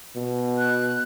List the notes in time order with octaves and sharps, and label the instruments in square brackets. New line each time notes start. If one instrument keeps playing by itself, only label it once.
[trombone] B2
[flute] F#6